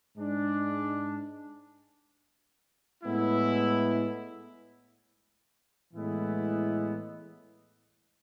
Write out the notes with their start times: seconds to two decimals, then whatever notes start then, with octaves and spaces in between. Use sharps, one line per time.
0.15 G#2 G#3 D4
3.04 A2 G#3 B3 E4
5.93 A2 E3 G#3 B3 E4